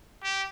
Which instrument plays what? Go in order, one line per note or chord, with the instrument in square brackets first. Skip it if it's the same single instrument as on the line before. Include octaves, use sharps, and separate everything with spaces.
[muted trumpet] G4